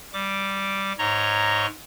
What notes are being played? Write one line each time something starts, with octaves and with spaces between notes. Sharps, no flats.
G3 D6
G#2 C#5 D#5 A#5 C#6